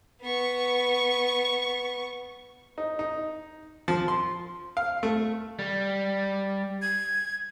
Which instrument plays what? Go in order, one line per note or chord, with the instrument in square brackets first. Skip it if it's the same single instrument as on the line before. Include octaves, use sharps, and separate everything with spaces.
[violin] B3 C#6
[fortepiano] D#4
D#4
F3
C6
F5
A3
[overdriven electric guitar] G3
[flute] G#6